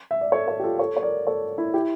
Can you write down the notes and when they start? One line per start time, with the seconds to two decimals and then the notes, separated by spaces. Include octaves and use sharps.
0.11 E5
0.21 D5
0.32 A4 C#5
0.48 A4 C#5
0.60 G4
0.63 F4 A4
0.79 A4 C#5
0.97 C#5
1.03 A#4 D5
1.27 A4 C#5
1.58 E4
1.74 E4 G4